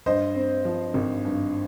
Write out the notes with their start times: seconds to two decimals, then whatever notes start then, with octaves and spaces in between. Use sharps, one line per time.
0.06 G2 C5 D#5
0.35 C4
0.65 F3
0.94 G#1
1.25 G2